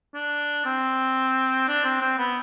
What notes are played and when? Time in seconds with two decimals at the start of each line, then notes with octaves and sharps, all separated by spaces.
0.14 D4
0.65 C4
1.68 D4
1.84 C4
2.01 C4
2.18 B3